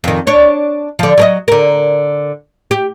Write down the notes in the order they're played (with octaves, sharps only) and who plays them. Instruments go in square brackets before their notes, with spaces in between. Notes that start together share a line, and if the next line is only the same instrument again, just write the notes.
[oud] F2 D#3
D4 C#5
D3 F3
F#3 A#4 D#5
D3 A#4
G4